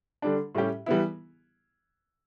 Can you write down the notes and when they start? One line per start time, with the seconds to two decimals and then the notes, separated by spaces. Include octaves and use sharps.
0.22 D3 G3 D4
0.55 A2 G3 C#4 G4
0.86 E3 G3 B3 E4